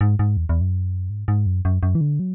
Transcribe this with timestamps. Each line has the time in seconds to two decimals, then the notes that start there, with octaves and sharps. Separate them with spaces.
0.01 G#2
0.19 G#2
0.37 E2
0.49 E2
0.61 F#2
1.10 G#2
1.28 G#2
1.46 F#2
1.65 F#2
1.83 F#2
1.95 E3
2.01 D3
2.20 F#3